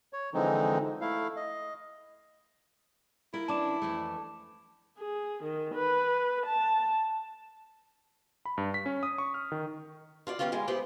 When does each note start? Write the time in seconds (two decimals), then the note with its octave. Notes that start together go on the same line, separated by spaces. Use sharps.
0.13 C#5
0.34 D3 E3 F3 G#3 C4 D#4
1.01 A3 E4 F5
1.36 D#5
3.34 E4 F4 A#4
3.48 E3 C#4 D4 A5 D6 E7
3.82 F2 E3 A3
4.97 G#4
5.43 D#3
5.75 B4
6.45 A5
8.45 B5
8.58 G2
8.74 B6
8.86 C#4
9.03 D#6
9.18 C#6
9.34 F6
9.52 D#3
10.27 F4 F#4 D5
10.39 D#3 F#3 G3 B3 C#4 F4
10.52 G3 G#3 E4 F4
10.68 B3 E4 G4 G#4 B4 C5